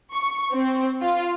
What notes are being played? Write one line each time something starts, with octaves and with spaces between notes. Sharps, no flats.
C#6
C4
F4